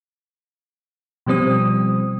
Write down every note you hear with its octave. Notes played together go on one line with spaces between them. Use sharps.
B2 F3 G3 C4 D#6